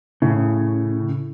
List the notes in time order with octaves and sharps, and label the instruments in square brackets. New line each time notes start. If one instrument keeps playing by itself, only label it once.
[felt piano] A2 [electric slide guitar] C#3